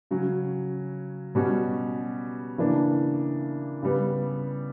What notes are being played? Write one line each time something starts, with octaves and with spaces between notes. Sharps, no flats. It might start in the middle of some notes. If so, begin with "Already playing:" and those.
C#3 F#3 C#4
B2 G3 C#4 F#4
C#3 E3 A#3 D4
C#3 G3 B3